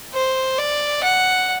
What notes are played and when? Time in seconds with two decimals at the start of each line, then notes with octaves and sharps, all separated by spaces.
0.14 C5
0.59 D5
1.04 F#5